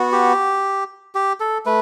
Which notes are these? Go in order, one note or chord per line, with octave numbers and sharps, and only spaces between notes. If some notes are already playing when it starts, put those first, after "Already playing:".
Already playing: B3 F#4
G4
G4
A4
A3 B4